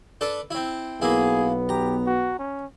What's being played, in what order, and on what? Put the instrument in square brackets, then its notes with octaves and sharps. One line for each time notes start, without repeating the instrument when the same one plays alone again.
[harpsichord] D4 A4 B4
C4 E4
[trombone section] B1 B3 [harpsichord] A#3 E4 [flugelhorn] G#4
[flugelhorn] G4 [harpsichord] A#5
[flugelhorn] F#4
C#4